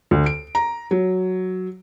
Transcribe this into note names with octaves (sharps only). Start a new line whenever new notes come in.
D2
D7
A#5
F#3